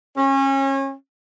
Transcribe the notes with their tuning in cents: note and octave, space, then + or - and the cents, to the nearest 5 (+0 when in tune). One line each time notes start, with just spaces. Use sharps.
C#4 -30